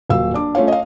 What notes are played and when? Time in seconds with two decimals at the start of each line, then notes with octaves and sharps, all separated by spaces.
0.09 D#1 F#3 F5 E6
0.34 D4 D6
0.55 A3 C#4 F4 C#5 F5
0.68 D#5 F5